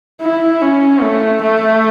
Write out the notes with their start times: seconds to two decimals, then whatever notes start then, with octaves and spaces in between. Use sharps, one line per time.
0.21 E4
0.62 C#4
1.02 A3
1.41 A3